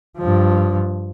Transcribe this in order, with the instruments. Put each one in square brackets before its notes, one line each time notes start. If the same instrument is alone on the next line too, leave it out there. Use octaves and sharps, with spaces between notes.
[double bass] G2 F3